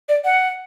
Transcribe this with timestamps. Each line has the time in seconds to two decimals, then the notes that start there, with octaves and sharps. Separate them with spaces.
0.09 D5
0.25 F#5